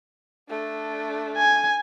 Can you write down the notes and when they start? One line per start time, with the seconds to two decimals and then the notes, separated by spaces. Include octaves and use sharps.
0.49 A3 D4
1.37 G#5